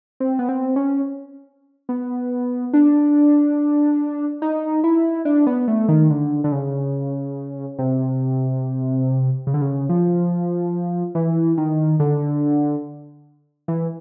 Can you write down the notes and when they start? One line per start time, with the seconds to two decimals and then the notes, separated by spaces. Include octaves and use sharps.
0.20 C4
0.39 B3
0.49 C4
0.76 C#4
1.89 B3
2.73 D4
4.42 D#4
4.84 E4
5.25 D4
5.47 B3
5.68 A3
5.89 D#3
6.10 D3
6.44 D3
6.52 C#3
7.79 C3
9.47 C#3
9.54 D3
9.61 C#3
9.89 F3
11.15 E3
11.57 D#3
12.00 D3
13.68 E3